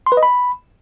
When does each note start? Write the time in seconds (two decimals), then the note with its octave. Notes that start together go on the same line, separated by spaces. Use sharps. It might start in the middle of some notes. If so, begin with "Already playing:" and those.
0.06 C6
0.12 B4
0.17 D#5
0.23 B5